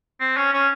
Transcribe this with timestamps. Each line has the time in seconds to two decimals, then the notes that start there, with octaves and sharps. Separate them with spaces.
0.20 C4
0.37 C#4
0.53 C#4